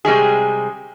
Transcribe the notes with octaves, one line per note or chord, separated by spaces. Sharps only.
C3 G3 G#3 G#4